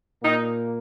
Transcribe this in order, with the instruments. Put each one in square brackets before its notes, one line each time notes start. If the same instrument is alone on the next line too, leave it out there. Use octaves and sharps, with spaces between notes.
[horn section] A#2 A#3 D#4